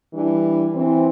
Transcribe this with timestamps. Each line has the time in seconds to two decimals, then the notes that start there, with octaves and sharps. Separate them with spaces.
0.13 E3 G3 D4
0.74 E3 C4